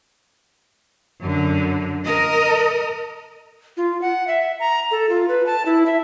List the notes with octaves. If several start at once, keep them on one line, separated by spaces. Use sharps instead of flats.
F#2 D3
A#4 D#5
F4
F#5
E5
A#5
A4
F4
B4
A5
E4
E5